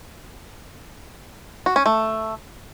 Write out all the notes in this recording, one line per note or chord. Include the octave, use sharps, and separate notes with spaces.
F#4
C#4
A3